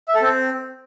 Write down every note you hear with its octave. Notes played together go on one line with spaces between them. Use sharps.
E5
A4
C4